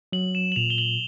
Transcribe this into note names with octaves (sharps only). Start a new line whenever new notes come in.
F#3 F#7
E7
F#7
A#2 F7
G7
F#7